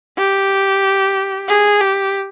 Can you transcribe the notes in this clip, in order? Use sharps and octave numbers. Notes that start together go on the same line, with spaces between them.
G4
G#4
G4